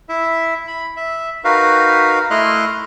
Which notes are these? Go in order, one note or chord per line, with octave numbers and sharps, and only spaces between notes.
E4 E5
B5
E5
D#4 F#4 A#4 B4 F5
A3 E4 D#5 C6 F6 F#6